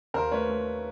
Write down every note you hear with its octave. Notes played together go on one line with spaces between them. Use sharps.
D#2 A#4 C5
A3 B4 C#5
A3